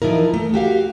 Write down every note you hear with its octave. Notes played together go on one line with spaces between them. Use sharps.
E3 F3 D#4 E4 A#4
A3
F#4 G4 F5